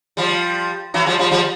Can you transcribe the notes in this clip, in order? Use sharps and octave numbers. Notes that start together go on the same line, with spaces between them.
F3 G3
E3 F#3
F3 G3
F3 G3
F3 G3